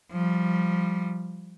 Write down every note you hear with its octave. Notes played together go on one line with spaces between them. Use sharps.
F3 G3